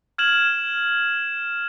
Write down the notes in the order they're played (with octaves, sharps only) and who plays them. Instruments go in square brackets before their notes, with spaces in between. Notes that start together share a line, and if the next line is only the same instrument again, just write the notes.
[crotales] F6 G#6 E7 F#7